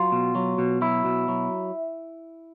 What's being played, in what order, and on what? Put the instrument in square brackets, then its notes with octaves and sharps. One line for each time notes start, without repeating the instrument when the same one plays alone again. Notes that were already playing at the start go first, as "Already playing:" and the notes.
Already playing: [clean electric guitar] F#3 F4
B2
F#3
B2
F#3 E4
B2
F#3